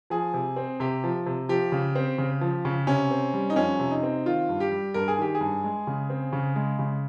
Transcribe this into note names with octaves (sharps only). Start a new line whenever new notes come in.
F3 G#4
C3
C4
C3 G4
F3
C3
F3 G4
C#3
C4
C#3
F3
C#3
C3 C#4
C4
G3
D#4
F2 C#4
C3
D#4
C4
D#3 F4
G2
G4
G3
G2 A#4
G#4
D#3 G4
G#4
G2
G#3
C#3
C4
C#3
G#3
C#3